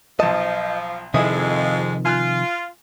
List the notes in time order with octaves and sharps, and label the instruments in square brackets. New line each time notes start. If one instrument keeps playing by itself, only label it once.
[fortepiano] B1 A5 [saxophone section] F3 [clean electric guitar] D#5
[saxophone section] F2 G#3 [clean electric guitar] C3 D#3 F3 [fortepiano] E4 G#4 D#6
[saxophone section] F4 [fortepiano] G#5 F6 F#6